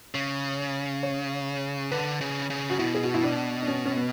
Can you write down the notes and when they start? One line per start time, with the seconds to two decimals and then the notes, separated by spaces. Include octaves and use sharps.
0.14 C#3
1.03 C#5
1.91 D3 B4
2.21 C#3
2.50 C#3
2.70 F#4
2.79 B2 E4
2.95 G#4
3.04 F#4
3.14 E4
3.23 D4
3.62 D4
3.68 C#4
3.85 C#4
3.97 B3